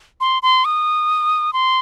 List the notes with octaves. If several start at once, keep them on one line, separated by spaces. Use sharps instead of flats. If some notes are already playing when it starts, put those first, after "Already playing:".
C6
C6
D#6
C6